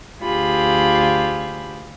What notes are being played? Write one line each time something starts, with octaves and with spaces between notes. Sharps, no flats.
D2 F4 G4 G#4 B5